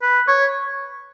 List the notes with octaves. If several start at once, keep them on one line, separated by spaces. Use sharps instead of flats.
B4
C#5